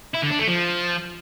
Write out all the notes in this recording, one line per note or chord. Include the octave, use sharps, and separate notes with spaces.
E4
D3
D4
A3
F3